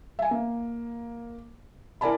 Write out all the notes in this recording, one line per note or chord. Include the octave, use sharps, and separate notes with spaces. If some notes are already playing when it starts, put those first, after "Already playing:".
E5 G#5
A#3
E4 A#4 D5 G#5 A5 B5